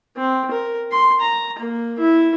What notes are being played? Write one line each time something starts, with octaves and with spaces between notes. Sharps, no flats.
C4
A#4
C6
A#5
A#3
E4